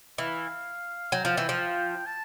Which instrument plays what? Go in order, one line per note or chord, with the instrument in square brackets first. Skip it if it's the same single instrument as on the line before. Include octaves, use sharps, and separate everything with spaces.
[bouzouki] E3 [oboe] F5
[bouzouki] F#3 [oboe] G5
[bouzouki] F3
E3
F3
[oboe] A5